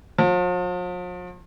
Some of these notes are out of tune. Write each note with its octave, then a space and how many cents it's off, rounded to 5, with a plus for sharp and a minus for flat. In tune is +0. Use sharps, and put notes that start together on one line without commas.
F3 +45